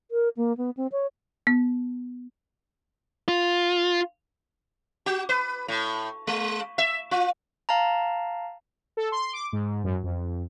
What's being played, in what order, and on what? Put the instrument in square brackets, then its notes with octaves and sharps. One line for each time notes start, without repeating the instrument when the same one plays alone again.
[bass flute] A#4
A#3
B3
C4
C#5
[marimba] B3
[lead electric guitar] F4
[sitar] F#4
B4
A2
G#3
E5
F4
[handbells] F5 A5 A#5
[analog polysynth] A4
C6
D6
G#2
F#2
F2